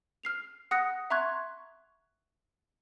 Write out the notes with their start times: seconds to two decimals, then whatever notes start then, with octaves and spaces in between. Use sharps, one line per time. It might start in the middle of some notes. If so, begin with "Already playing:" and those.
0.23 F6 C7 F7
0.71 F#5 D#6 F#6 A#6 C#7
1.10 E5 A#5 C6 C#6 F#6 G#6